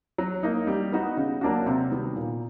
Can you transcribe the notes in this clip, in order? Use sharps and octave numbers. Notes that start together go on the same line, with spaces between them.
F#3
A#3 D#4
G3
B3 D#4 F#4
C#3
F#3 A#3 D4 F#4
C3
D#3 G3 B3
A#2